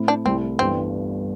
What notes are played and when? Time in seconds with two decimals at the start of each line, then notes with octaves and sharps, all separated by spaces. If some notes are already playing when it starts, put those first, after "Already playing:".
Already playing: A2 A3 C4 E4
0.08 D4
0.25 C2 C3 A3 C4 E4
0.59 G1 G2 E3 C4